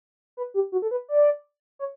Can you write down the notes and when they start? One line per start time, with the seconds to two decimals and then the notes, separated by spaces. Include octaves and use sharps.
0.37 B4
0.54 G4
0.72 F#4
0.82 A4
0.91 B4
1.09 D5
1.79 C#5